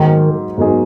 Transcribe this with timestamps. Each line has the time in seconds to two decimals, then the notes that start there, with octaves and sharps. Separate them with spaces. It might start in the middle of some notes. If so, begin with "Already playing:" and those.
Already playing: G#2 D#3 F#3 A#3 D#4 G#4
0.58 G#2 F#3 A#3 D#4 G#4